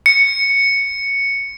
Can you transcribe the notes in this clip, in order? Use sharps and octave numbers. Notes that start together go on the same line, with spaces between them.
C#7